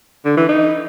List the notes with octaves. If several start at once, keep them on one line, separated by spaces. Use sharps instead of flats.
D3
E3
D#4